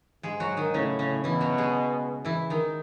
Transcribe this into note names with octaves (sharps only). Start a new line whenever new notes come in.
G#2 G#3 G#4
F#3 F#4
D#3 D#4
A2 C#3 C#4
C#3 C#4
B2 E3 E4
F#3 F#4
G#3 G#4
E3 E4
D#3 D#4